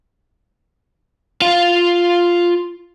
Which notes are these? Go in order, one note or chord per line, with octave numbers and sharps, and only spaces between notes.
F4 F5